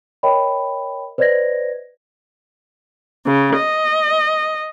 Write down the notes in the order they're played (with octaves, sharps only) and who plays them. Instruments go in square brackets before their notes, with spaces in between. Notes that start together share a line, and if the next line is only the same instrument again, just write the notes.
[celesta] A#4 C#5 D#5 G5 B5
B4 C5 D5 D#5 G#6 A#6
[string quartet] C#3
D#5